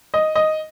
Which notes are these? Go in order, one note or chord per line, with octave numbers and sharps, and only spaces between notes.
D#5
D#5